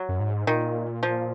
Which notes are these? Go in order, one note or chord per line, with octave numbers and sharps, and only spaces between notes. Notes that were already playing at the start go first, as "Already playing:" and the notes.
Already playing: F#3
F#2
G#2
A#2 D#3
F3